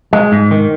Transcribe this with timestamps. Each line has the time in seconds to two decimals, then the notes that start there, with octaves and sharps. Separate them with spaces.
0.13 G#3
0.32 G#2
0.51 D#3